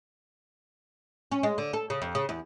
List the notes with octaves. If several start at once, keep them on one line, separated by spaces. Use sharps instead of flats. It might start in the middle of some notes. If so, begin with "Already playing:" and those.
C#4
G#3
D3
A4
C#3
F2
C#3
E2